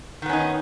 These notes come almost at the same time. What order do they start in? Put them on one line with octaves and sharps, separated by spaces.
D#3 B3 C#4 D#4